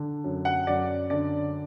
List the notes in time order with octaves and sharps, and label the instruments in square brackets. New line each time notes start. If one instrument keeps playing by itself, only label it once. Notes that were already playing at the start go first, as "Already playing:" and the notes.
Already playing: [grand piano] D3
F#2
F#5
F#2 D5
D3 D5